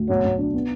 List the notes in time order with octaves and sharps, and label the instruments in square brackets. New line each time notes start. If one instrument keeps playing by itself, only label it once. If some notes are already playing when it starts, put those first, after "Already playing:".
Already playing: [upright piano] D2
[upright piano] B1 [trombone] F#3
[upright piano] B1
D4
B3